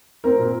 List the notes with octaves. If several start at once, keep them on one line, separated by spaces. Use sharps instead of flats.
C4 A#4
A#2